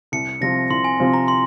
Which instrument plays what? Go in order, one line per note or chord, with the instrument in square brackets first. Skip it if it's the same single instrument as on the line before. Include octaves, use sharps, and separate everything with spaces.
[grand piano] C2 [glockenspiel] C#7
[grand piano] C3 F3 C4 F4 [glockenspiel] A#6
[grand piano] C2 [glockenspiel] C6
[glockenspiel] G#5
[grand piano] C3 F3 C4 F4
[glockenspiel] A#5
C6